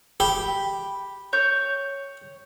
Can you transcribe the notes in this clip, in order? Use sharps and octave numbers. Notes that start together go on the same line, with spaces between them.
G4 B5
C#5 G6